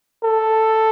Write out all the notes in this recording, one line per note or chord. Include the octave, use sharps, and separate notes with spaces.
A4